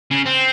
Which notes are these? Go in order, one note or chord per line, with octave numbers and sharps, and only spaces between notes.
C#3
C4